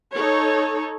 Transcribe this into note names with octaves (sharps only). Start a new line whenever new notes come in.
D#4 A4 C#5